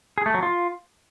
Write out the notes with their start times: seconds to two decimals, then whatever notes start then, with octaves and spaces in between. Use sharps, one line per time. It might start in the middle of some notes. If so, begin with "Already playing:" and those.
0.18 G#4
0.26 A3
0.34 F#3
0.43 F4